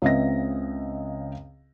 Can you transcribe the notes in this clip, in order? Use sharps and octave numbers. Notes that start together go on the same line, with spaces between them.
C#2 C#3 C4 D#5 E5 A#6